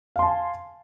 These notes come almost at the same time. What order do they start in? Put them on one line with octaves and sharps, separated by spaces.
F5 C6 A5 G#5